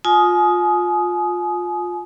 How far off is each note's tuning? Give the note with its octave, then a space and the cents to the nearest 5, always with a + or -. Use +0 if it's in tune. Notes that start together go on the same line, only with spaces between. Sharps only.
F4 +20 G#5 +35 D#6 +0